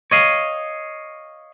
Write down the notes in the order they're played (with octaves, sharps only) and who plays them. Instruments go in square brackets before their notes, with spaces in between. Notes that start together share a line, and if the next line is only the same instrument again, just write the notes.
[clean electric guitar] C#5 D#5 F5